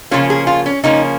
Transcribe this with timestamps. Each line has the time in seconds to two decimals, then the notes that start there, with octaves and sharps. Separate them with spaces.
0.11 C#3 F3 A#3 C#4 F4
0.30 G#4
0.47 F4
0.66 C#4
0.83 C#3 F3 A#3 C#4 D#4